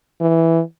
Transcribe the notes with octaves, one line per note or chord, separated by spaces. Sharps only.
E3